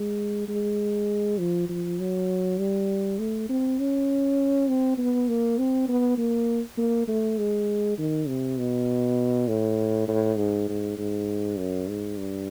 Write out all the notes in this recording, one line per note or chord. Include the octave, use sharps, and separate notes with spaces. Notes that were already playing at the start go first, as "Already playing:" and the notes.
Already playing: G#3
G#3
F3
F3
F#3
G3
A3
C4
C#4
C4
B3
A#3
C4
B3
A#3
A#3
A3
G#3
D#3
C3
B2
A2
A2
G#2
G#2
G#2
F#2
G#2
G2